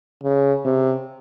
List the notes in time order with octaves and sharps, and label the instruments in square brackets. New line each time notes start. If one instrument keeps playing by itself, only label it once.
[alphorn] C#3
C3